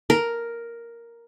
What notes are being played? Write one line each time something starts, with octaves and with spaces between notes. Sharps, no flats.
A#4